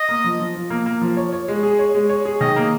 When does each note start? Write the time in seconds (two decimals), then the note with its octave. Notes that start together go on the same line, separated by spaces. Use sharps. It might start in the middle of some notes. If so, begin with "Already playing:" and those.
Already playing: D#5
0.09 A#3
0.24 F3
0.39 F3
0.55 F3
0.70 A#3
0.86 A#3
1.01 F3
1.17 C#5
1.33 C#5
1.48 G#3
1.63 G#4
1.79 C#5
1.95 G#3
2.09 C#5
2.25 G#4
2.41 D#3 D#5
2.56 A#3